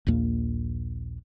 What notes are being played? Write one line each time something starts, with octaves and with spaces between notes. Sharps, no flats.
A#1 D#2 A#2 A#3